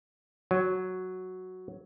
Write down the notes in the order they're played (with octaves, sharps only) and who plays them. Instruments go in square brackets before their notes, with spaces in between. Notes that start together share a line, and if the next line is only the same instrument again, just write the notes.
[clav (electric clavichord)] F#3